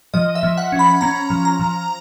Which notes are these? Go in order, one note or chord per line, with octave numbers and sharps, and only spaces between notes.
F3 D#5
E5
F3
F#5
C#4
B5
C#4 A#5
F3
A#5
F3